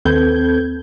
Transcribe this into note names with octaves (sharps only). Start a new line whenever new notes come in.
D#2 C4 A4 B4 G6 G#6